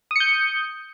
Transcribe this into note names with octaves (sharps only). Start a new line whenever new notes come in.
D#6 G6 C#7